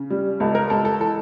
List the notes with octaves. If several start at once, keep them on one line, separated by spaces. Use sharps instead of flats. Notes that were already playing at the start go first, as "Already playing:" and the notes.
Already playing: C#3
G3
C#2 A4
A#4
C#2 A4
A4
E3 A4